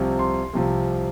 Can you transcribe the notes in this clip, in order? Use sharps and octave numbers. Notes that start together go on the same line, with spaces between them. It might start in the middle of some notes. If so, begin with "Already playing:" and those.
Already playing: C2 C3 F3
C6
C2 C3 F3